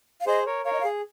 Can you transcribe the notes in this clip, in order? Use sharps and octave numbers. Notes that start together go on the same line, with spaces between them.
F5
G#4 C5 D#5
A#4 C#5
A#4 C#5 F5
D#5
F5
G#4